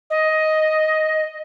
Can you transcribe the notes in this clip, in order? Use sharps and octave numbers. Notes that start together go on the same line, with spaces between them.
D#5